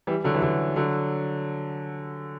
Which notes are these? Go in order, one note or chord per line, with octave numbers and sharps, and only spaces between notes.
E3 G3
D3 F#3
E3
D3 F#3
D3 F#3